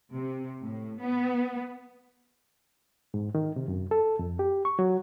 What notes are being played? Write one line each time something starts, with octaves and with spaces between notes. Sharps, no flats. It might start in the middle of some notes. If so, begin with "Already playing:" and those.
C3
A2
B3
G#2
D#3
C3
F#2
A4
F2
G4
C#6
F#3